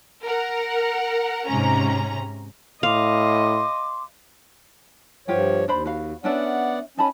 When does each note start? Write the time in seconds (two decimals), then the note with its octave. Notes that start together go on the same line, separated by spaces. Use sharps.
0.24 A#4 F#5
1.47 G#2 C3 C#4 A#5
2.83 A2 D#5 F5 C6 D6
5.28 G2 F3 F4 G4 C#5 F#5
5.68 D#2 D4 C5 B5
5.85 F#4 F5
6.24 B3 C#4 D4 D5 E5 F#5
6.97 C#4 D#4 A5 B5